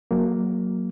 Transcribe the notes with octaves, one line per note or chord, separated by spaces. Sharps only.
F#3 A#3